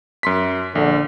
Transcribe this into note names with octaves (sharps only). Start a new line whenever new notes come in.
F#2 C6 B6
A#1 D3